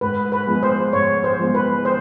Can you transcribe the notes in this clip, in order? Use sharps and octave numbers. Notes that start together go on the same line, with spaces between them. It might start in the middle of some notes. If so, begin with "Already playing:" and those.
G#2 B4
B4
F3 G#3 B3
C5
G#2 C#5
C5
F3 G#3 B3
B4
C5